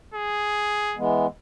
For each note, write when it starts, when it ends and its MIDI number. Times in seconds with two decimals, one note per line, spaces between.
0.14 0.97 68
0.97 1.27 52
0.97 1.27 56
0.97 1.27 59